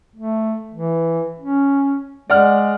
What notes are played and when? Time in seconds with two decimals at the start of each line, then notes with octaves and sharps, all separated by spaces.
0.16 A3
0.73 E3
1.39 C#4
2.30 G#3 D5 F#5 F6